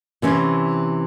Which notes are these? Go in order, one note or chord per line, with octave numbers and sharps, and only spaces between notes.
C3 E3 C#4 E4